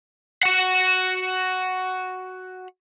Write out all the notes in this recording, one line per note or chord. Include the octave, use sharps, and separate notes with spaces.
F#4 F#5